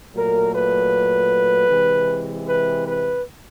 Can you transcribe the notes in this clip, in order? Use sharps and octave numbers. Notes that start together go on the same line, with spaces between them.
A#2 F#3 A3 A#4
B4
C3 E3 G#3
B4
B4